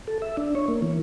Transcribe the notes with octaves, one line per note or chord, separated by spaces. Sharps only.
A4
E5
D4
C#5
A#3
E3